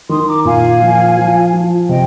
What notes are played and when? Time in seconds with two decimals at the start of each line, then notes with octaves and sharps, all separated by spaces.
0.09 D#3 C6 D#6
0.27 A#5 D6
0.45 A#2 F5 G#5
0.81 F3
1.17 F3
1.53 F3
1.89 C3 D#5 G5